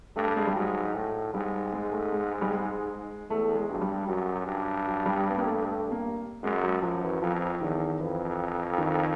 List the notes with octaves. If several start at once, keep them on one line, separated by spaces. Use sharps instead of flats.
G2 A3
A3
G#3
G3
G#2 F#3
A2
G#2 G3
G#3
A3
G#3
G3
G#3
E2 A3
G#3
G2 F#3
G3
F#2 F#3
G2
F#3
G3
B3
A#3
A3
A3
A#3
F#2 G#3
F#3
F#2 F3
E3
F2 F3
E2 D#3
F2 E3
D#3